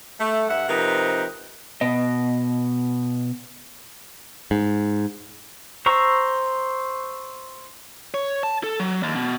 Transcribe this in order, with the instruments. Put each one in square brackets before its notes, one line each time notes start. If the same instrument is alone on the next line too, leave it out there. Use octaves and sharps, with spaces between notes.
[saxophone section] A3
G2 E5 F#5
C3 F3 D#4 A#4 B4
[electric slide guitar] B2 D#5
[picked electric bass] G#2
[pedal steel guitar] C5 A#5 C#6 E6
[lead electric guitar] C#5
A5
A4
F#3
D#2
B2